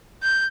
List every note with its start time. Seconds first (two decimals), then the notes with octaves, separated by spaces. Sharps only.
0.23 G6